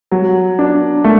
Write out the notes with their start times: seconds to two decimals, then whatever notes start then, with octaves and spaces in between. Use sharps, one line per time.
0.12 F#3
0.59 D4
1.04 A3